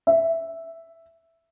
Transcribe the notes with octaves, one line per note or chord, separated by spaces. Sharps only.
E5